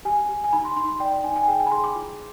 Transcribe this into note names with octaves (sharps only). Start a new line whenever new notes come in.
G4 G#5
G4
G#5
D#4 B5
C6
D#4 C6
C6
D5 G5
G5
D#4 G#5
G#5
G#4 G5
G#5
B5
G#4 C6
D6
F4